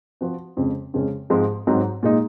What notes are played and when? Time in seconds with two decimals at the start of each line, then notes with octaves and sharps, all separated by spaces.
0.21 F3 C4 F#4
0.57 F2 C#3 G#3 C4
0.94 F2 C#3 G#3 C#4
1.30 G#2 F3 G#3 C4
1.67 G#2 F#3 C4 D#4
2.03 A#2 G#3 D#4